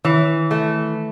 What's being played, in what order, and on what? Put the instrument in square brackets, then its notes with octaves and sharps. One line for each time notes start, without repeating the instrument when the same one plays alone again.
[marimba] D#3 [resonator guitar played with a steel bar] E3
[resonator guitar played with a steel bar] A3